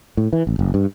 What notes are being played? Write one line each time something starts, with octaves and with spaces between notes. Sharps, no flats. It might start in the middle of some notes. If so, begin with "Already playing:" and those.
A2
E3
A1
F#1
G2